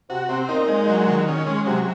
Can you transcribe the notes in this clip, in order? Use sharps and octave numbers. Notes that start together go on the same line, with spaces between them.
C3 F#4
C3 C4
A#2 D#4
G#3
F#3
D#3
C#4
G#3
C3 F#3